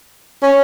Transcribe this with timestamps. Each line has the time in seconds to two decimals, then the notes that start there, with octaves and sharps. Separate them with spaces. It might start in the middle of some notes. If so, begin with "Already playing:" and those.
0.43 C#4